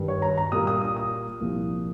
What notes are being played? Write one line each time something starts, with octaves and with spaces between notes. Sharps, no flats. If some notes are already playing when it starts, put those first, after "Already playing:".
Already playing: G2 D#3 G3
C#5
A#5
A#5
A#2 G3 A#3 D#6
D#6
D#6
D#6
C2 A#2 F3 A#3